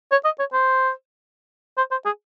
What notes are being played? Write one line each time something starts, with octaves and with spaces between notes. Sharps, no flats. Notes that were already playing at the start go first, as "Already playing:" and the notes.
C#5
D#5
C#5
C5
C5
C5
G#4